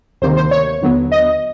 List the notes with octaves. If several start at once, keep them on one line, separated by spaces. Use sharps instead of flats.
D2 C3 D#3 G3 A#3 C5
C5
C#5
D#2 D3 F#3 B3
D#5